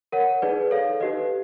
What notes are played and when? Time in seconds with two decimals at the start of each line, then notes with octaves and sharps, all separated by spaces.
0.12 A#4 C#5 F#5
0.42 D#4 G#4 B4 D5
0.71 A4 C#5 F5
1.00 D#4 G4 B4 D#5